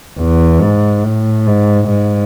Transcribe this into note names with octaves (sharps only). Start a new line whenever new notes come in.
E2
G#2
A2
G#2
G#2